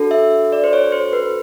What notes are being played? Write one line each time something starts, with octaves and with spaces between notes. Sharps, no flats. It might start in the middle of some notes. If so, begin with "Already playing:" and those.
Already playing: D4 F#4 A4
E5
D5
C5
C#5
C5
B4